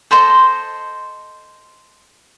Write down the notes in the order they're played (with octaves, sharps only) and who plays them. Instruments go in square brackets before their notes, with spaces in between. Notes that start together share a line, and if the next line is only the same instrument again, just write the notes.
[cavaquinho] A4 C5 D#5 C6